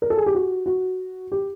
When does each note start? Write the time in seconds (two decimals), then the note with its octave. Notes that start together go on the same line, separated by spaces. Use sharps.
0.02 A#4
0.10 A4
0.17 G#4
0.26 G4
0.35 F#4
0.66 F#4
1.32 G4